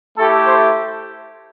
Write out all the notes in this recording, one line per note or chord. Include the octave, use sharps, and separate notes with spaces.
A3 E4 G4 A4
C5